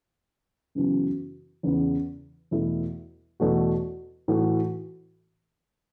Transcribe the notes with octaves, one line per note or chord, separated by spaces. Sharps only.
F#2 C#3 E3 B3 F#4
E2 C#3 E3 B3
E2 B2 A3 E4
E2 B2 A3 F#4
A2 E3 A3 F#4